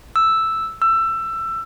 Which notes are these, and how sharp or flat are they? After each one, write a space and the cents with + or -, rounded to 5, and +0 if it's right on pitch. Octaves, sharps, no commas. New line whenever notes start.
E6 +0
E6 +20